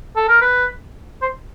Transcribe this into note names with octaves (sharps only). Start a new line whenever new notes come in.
A4
A#4
B4
C5